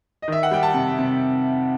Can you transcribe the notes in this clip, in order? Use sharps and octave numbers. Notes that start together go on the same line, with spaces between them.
D#5
D#3 E5
F#5
G3 G5
A5
C3
C3